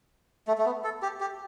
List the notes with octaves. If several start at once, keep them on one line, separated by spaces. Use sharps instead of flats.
A3
A3
B3
A4
G4
G4